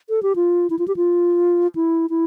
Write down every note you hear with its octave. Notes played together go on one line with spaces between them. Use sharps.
A4
G4
F4
E4
F4
G4
F4
E4
E4